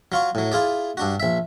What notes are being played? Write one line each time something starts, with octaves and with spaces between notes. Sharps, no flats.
F#3 F4 C#6
A2 F#3
E4 F4 G#4 D5
G2 D4 F#4
A#1 E5